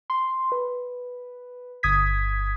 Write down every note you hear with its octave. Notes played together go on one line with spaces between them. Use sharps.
C6
B4
G1 D#6 G#6 B6